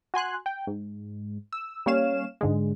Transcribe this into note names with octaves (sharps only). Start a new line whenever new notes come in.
F#4 G#5 C6 F#6
G5
G#2
E6
G3 A#3 C#4 C#5 F5 E7
G#2 D3 G#3